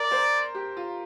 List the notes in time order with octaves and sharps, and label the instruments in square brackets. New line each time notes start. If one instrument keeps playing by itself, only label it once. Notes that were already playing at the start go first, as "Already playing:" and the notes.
Already playing: [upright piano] A#4 [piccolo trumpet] D5
[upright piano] C5
G4
F4